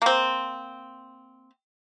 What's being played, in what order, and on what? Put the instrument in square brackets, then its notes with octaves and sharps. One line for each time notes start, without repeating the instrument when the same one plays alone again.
[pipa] A#3 C4